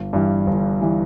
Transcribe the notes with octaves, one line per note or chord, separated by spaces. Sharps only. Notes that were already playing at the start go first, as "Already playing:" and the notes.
Already playing: G1
G2 E3 G3
G1
E3 G3